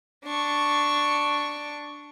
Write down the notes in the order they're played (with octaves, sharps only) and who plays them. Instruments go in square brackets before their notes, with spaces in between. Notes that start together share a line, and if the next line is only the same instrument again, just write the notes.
[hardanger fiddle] D4 C#6